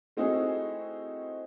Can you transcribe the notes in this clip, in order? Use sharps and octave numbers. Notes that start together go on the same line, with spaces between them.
A3 C4 D#4 E4 F#4 G#4